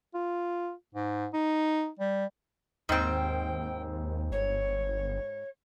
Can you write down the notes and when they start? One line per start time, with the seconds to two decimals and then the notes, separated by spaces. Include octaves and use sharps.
0.14 F4
0.95 G#2
1.33 D#4
1.99 G3
2.89 D#2 G#2 C4 G5
4.31 G1 C#5